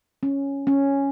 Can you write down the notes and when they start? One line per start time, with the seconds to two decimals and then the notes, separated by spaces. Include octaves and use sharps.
0.23 C#4
0.67 C#4